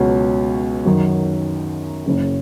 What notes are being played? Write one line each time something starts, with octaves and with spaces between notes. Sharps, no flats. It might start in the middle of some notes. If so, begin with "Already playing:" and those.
Already playing: C#2 B2 F#3 C#4
F#2 D#3 F#3
F#1 F#2 C#3